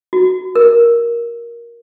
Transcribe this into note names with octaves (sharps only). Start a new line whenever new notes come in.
F#4
A#4